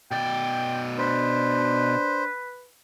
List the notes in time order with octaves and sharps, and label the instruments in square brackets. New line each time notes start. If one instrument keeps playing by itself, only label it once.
[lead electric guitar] B2 D5 [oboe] G5
[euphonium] D4 [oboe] B4 [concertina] C5